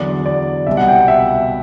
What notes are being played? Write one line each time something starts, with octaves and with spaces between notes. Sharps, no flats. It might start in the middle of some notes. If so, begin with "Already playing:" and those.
Already playing: E2 D3 F#3 D5
D5
C2 B2 G3 E5
F#5
G5
E5